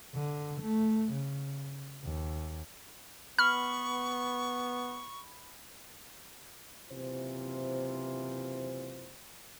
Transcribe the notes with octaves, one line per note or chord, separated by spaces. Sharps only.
D3
A3
C#3
D#2
B3 B5 C#6 F6
F#1 C3 E3 F4 C5